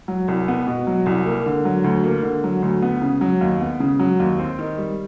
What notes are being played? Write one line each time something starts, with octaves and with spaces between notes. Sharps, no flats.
F#3
C2
B3
B2
F#3
C2
A#3
D3
F#3
D2
A#3
D3
F#3
D2
B3
C#3
F#3
D#2
B3
C#3
F#3
D#2
C4
D#3
G3